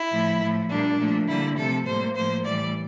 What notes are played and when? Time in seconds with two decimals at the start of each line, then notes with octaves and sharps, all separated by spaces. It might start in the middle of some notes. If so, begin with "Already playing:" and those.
Already playing: E4
0.11 A2 F3 A3
0.40 A2 F3 A3
0.69 A#2 G3 A#3 D4
0.99 A#2 F3 A3
1.28 D3 G3 A#3 E4
1.57 C3 F3 A3 A4
1.86 A2 G3 A#3 C5
2.15 A2 F3 A#3 C5
2.45 A2 E3 G3 D5